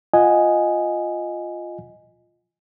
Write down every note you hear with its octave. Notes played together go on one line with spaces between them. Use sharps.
F4 D#5 F#5 G#5